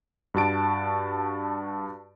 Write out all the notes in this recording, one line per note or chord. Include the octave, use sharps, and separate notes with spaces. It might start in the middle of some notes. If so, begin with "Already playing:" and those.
G2 F#4 A5 D7